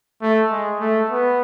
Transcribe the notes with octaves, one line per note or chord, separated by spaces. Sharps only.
A3
G#3
A3
B3